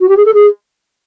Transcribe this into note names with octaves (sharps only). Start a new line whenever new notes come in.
F#4
G4
G#4
A4
G#4